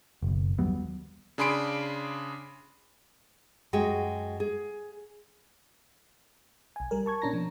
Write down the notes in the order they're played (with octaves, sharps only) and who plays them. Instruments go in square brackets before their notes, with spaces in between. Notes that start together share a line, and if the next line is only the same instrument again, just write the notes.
[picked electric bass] F#1 B1
D#2 F#3 G3 B3
[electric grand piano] C#3 D4 G#4 B5 C6 D7
[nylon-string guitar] F#2 G#3 F#4 G#4 G5
G#4
[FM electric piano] B1 G#5
G3 A#4
A5 C#6 G#6
A#2 C#4 D4 A#5 A#6
B2 F3